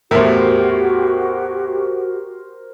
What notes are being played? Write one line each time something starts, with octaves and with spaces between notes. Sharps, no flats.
E2 A2 F#4 G4 A#4 C5